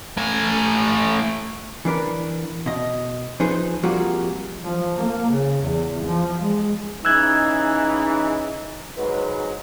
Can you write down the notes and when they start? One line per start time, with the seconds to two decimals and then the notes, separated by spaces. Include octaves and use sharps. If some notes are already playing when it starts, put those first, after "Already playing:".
0.17 A2 G#5
1.85 E3 D4 A#4 B4
2.66 B2 D#5
3.40 F3 D#4 G#4 B4 C5
3.83 F2 G3 A#3 F4 F#4 G#4
4.63 F3
4.95 A#3
5.31 C#3
5.63 E2
6.05 F3
6.42 G#3
7.05 C#3 E3 D#4 G#4 E6 F#6 G#6
8.97 G#2 F#3 G#3 B4